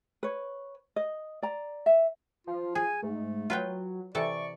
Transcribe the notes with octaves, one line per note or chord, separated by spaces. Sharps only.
B4 C#5
D#5
D5 A#5
E5
F3 F4
G#4 G#5
G#2 A3
F#3 F4 B4 G5
C3 E3 A4 D5 C#6